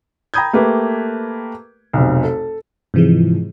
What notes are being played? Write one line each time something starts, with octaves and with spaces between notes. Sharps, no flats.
G5 A#5 B5 D#6 G6 G#6
A3 A#3 G4 B4
F1 B1
A4
G#2 C3 E3 F3 G#3